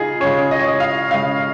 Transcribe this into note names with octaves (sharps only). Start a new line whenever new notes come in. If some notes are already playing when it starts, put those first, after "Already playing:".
Already playing: C#3 D#4 F4 G#4
C#3 G#3 C#4 C#5
D#5
C#5
D#5
F5
C#3 G#3 C#4 F5